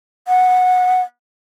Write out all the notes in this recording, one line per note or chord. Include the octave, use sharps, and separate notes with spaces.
F#5